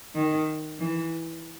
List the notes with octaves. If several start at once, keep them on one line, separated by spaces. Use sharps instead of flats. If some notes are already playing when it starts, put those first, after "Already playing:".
D#3
E3